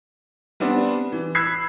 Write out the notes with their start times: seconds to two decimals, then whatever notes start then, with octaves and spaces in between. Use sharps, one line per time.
0.60 G3 B3 C4 D4
1.12 E3
1.35 B5 E6 F#6 G#6 B6 C7